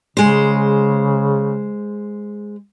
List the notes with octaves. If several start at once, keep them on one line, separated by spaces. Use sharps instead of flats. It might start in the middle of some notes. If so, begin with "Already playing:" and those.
C#3 G#3 C5